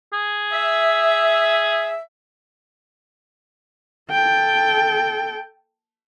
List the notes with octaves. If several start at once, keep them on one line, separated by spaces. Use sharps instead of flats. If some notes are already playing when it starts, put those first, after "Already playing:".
G#4
E5
A4 G5